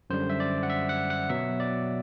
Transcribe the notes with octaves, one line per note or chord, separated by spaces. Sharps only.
F#2 D3 G3 C5
E5
D5
F#5
E5
F#5
F#5
B2 F#3 B3 E5
D5